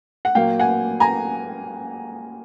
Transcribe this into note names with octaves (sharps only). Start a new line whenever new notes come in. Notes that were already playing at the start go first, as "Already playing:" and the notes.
F#5
A#2 F#3 A#3 F5 G5
F#5 G#5
G#5 A#5